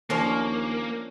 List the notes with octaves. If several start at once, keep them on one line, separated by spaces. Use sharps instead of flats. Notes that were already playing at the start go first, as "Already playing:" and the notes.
D#2 F3 A#3 C#4 D4 A#4 C#5